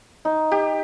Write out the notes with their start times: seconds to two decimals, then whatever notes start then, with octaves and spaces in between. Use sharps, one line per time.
0.25 D#4
0.51 G4